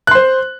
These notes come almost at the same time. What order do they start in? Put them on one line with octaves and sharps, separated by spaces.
F#6 C6 C5